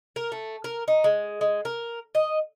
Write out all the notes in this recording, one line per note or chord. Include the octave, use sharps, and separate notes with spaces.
A#4
A3
A#4
D#4
G#3
G#3
A#4
D#5